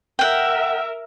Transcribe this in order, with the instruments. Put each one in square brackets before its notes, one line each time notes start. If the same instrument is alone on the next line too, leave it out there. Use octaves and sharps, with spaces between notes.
[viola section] A#4 E5 [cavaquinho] F#5 G5